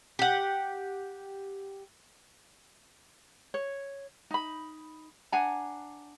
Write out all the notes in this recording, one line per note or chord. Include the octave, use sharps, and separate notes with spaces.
G4 F#5
C#5
D#4 B5
D4 F#5 G#5 A#5